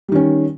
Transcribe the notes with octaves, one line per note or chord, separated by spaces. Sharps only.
D#3 G3 C#4